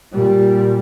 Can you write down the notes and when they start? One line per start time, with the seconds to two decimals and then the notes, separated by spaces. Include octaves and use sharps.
0.13 A#2 G3